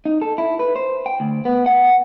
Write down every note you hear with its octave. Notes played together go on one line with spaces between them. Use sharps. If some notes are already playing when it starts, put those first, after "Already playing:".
D#4
A4
E4
B4
C5
G5
D2
B3
F#5